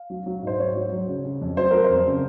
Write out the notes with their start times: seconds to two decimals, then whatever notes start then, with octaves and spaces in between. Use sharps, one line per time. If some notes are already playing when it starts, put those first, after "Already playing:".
Already playing: F5
0.10 F#3
0.26 F#3
0.42 G#2 C5
0.58 F#3 C#5
0.75 F#3
0.92 F#3
1.07 C#3
1.25 C#3
1.41 F2
1.57 F#3 C5
1.71 F#3 A#4
1.84 C5
1.90 F2
2.06 C#3